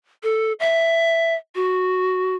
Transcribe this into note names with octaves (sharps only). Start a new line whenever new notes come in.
A4
E5
F#4